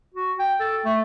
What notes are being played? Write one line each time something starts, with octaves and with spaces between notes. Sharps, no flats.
F#4
G5
A4
A3